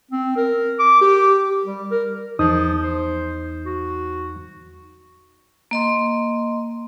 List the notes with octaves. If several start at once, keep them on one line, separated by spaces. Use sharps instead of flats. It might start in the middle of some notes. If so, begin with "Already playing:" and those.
C4
A#4
D6
G4
G3
A#4
E2 F3 D#4 D#6
C5
F#4
A#3 D#5 C6